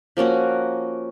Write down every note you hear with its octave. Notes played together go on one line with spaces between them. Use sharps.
F3 A#3 C#4 F#4